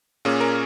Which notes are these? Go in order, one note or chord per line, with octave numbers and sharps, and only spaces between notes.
A#2 A#3 C#4 G#4
A#4